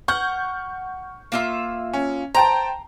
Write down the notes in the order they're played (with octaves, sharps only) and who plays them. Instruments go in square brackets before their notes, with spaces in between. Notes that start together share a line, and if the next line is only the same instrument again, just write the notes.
[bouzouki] F#5 [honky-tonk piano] C#6 F6 G6
[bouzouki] A#3 F4 E5
[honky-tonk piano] C#4
[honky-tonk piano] C5 G5 A5 [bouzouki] A#5